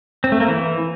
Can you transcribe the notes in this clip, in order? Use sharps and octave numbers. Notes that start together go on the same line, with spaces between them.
C4
A3
A#3
E3